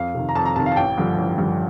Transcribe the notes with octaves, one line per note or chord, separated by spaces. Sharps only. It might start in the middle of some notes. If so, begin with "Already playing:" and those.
Already playing: F2 F5
C3 D#3
A#5
F2 A5
A#5
C3 D#3 A5
F5
A5
A1 G5
G2 D3 F3
A1
G2 D3 F3